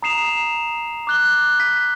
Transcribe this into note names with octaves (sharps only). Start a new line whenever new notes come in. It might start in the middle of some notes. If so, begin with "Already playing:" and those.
A#5 D#6 C7 E7 F7
D6 F#6 G7
B6